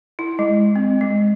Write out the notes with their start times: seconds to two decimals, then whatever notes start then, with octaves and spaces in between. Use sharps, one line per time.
0.19 E4
0.39 G#3
0.76 C4
1.01 G#3